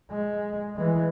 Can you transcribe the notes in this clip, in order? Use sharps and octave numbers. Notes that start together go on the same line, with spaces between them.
G#3
E3 G#3